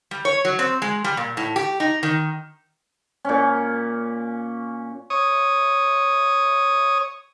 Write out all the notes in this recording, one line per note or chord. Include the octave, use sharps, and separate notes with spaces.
G3
C#5
F#3
C4
G#3
G3
A#2
A2
G4
D#4
D#3
A#2 C#4
C#5 D#6